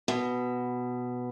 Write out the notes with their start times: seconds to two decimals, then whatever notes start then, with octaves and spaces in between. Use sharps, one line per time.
0.08 B2